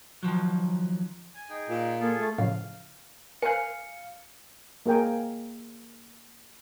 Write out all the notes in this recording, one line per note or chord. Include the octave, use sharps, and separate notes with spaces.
D#3 F3 F#3
G#5
D#4 G#4 G5
A#2
A#3 F4 G#4 A4
A3
A2 C#3 F3 F5
A#4 C5 F5 G#5 F#6 C#7
A#3 G#4 A#4 G5 G#5